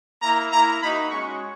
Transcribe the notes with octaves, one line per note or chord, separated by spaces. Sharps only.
A#3 E4 A#5
A#3 E4 A#5
A#3 D#4 F#4 B5
G#3 C#4 F#4 C#6